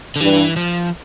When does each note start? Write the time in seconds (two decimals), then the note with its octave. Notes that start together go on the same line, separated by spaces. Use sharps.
0.16 D3
0.20 G2 E3
0.56 F3